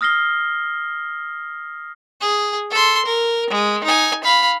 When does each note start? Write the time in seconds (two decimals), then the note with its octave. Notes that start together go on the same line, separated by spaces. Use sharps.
0.01 D#6 F6 A#6 C7 G7
2.21 G#4
2.71 A4 C6
3.06 A#4
3.50 G#3
3.84 D#4 G#5
4.24 F5 B5